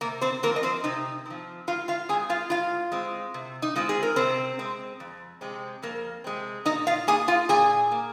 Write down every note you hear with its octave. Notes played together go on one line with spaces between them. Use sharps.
C3 A#3 A#4
C4 C5
F3 A#3 C4 A#4
D#5
C4 C5
C3 D#4 D#5
F3 C4
G#2 F4 F5
F4 F5
G#3 C4 G#4 G#5
F4 F5
G#2 F4 F5
G#3 C4
C3
D#4
G#3 C4 F4
G#4
A#4
C3 C4 C5
G#3 C4
F2
C3 G#3 C4
F2 A#3 A#4
C3 G#3 C4
A#2 D#4 D#5
F4 F5
A#3 G#4 G#5
F4 F5
A#2 G#4 G#5
A#3